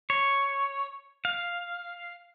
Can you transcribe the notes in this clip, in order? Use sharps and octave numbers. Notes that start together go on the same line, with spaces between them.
C#5
F5